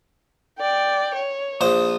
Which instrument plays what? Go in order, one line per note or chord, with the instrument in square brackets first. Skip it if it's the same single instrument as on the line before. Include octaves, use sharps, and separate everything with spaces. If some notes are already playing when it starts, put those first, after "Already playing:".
[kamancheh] D5 G5
C#5
[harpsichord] A#1 C5 [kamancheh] D#6